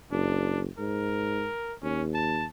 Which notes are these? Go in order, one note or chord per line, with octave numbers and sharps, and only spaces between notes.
F#1 D4
G#2 A#4
D#2 C#4
A5